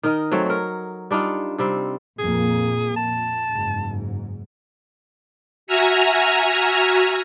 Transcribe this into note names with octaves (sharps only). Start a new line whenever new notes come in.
D#3 D#4 A#4 D#5
F#3 A3 C4 C#5
A#4 C#5
G3 D4 D#4 F4
C3 G3 C4
F2 A#2 A#3 G#4
A#2 A5
F#1 G#2
F#4 E5 G#5 A#5 F6